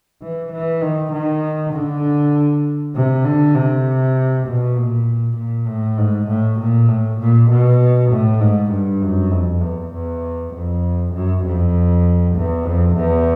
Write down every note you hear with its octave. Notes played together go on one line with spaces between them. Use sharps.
E3
E3
D#3
D#3
D3
C3
D3
C3
B2
A#2
A#2
A2
G#2
A2
A#2
A2
A#2
B2
A2
G#2
G2
F#2
F2
E2
E2
F2
F#2
F2
E2
F2
E2